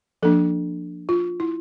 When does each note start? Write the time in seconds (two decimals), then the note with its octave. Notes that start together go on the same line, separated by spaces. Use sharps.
0.22 F3 A#3 D4 A4
1.09 F4
1.40 E4